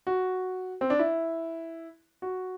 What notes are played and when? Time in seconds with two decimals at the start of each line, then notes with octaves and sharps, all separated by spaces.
0.07 F#4
0.81 C4
0.90 D4
0.99 E4
2.22 F#4